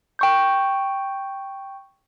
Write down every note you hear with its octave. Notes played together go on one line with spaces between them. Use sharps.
G5 C#6 G6